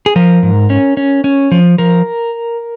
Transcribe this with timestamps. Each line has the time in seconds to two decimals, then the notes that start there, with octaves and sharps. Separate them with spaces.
0.06 G#4
0.16 F3 A#4
0.43 G#2
0.70 C#4
0.97 C#4
1.24 C#4
1.51 F3
1.78 F3 A#4